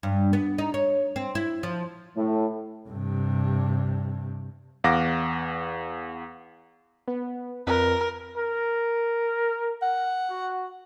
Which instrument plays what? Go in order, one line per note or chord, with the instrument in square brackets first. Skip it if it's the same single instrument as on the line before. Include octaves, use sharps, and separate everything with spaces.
[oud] G2
B3
D#4
C#5
C4
E4
F3
[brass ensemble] A2
[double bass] G2 C3
[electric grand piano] E2 F5 F#5 D6 A#6
[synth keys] B3
[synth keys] F2 B4 [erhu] A#4
[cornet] A#4
[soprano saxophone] F#5
[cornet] F#4